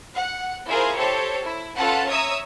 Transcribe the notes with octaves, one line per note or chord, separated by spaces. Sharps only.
F#5
E4 F4 G#4 A#4 C5
G4 A4 C5 C#5
E4
C#4 F4 A4 B4 F#5 A5
C#5 E5 A#5 D#6 E6